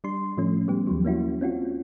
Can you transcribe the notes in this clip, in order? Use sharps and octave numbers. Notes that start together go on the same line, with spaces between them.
G3 D4 C6
A2 F3 A3 C#4
G3 B3 G4
D#2 F3 F#3
A#3 C#4 E4 F#4
C4 C#4 F4 F#4